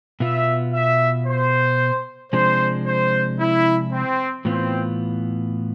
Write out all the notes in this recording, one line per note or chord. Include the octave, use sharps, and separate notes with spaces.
B2 B3 F4 E5
E5
C5
C3 F3 G#3 D4 C5
C5
E4
C4
A2 E3 B3 C4 F4